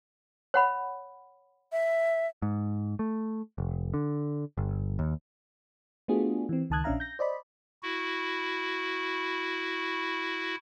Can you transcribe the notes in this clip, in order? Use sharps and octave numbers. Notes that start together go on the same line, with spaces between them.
C#5 F#5 B5
E5
G#2
A3
F1
D3
G1
D#2
A3 B3 D4 F4 F#4 G#4
E3 C4
C#2 D#3 A5 D#6 F#6 G#6
A#1 C#4 D4 E5 F5 A#5
G6 A#6
C5 D5 D#5 B5
E4 F#4